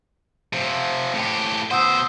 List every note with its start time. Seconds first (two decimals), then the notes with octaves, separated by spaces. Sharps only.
0.53 C3 F3
1.14 A2 G4
1.71 B2 C5 F#5 D#6 E6